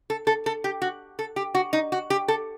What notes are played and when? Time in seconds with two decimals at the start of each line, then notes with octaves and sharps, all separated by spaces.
0.10 A4
0.27 A4
0.46 A4
0.64 G4
0.82 F#4
1.19 A4
1.36 G4
1.55 F#4
1.73 D#4
1.92 F#4
2.10 G4
2.28 A4